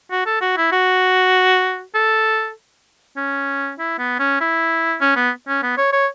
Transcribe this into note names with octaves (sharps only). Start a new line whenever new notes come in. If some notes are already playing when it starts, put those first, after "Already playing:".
F#4
A4
F#4
E4
F#4
A4
C#4
E4
B3
C#4
E4
C#4
B3
C#4
B3
C#5
C#5